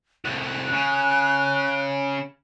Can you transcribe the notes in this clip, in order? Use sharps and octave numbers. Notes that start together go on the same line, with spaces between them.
C2 A2 F#6
C#3